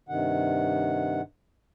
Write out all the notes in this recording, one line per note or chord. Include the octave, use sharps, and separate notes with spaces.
G2 C3 D#3 F#5